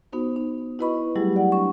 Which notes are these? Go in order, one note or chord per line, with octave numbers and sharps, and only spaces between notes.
B3 D#4 F#4 C5
D#4
E4 F#4 B4 D#5 B5 C#6
F#3 G3 A3 E4 G4 G#4
D5 F#5
D4 C#6